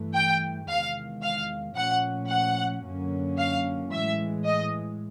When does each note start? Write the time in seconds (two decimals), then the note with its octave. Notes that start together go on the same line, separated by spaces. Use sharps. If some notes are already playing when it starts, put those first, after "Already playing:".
Already playing: G2 E3 A3
0.15 G5
0.68 E2 C3 D#3 G#3 F5
1.22 F5
1.76 A#2 F3 A3 C#4 F#5
2.29 F#5
2.83 F#2 D3 F#3 A#3 C#4
3.37 F5
3.91 A2 E3 G#3 E5
4.45 D#5